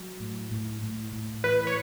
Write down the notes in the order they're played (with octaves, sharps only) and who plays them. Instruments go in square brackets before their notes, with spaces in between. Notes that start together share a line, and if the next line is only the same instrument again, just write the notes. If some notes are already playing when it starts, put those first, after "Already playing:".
Already playing: [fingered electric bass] F#3
A2
A2
A2
A2
[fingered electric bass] E3 [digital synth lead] B4
[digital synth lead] C#5